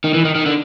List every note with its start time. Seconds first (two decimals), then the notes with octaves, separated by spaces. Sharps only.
0.04 D#3
0.14 E3
0.25 D#3
0.35 D#3
0.46 D3